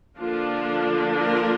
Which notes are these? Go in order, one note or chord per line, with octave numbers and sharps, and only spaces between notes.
D3 F3 A#3 D4 F4
F4 A#4